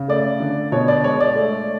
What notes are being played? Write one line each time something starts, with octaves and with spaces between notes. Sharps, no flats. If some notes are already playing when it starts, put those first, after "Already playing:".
Already playing: C#3
A3 D5
D3
B2 C#5
D5
G#3 C#5
D5
A3